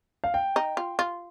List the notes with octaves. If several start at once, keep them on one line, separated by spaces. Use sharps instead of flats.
F5
G5
D#4
F4
F4